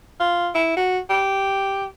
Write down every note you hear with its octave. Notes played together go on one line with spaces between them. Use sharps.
F4
E4
F#4
G4